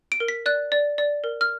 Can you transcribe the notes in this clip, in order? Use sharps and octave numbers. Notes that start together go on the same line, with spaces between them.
D7
A#4
B6
D5 F#6
D5
D5
A#4
F6